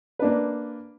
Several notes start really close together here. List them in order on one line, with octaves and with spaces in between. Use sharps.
B4 D4 A#3